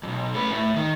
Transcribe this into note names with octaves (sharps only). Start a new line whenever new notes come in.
B1 F2
A3 B4
A2
D#3